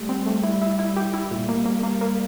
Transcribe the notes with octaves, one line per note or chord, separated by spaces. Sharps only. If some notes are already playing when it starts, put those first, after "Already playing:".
Already playing: G3 A3
C4
A3
G3 E4
E4
E4
G3 G4
E4
A#2
A#3
A#3
A#3
A#3